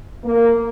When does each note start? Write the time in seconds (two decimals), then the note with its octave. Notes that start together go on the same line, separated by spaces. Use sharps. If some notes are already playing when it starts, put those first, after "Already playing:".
0.24 A#3